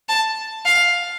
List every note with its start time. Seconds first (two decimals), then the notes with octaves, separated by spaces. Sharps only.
0.09 A5
0.65 F5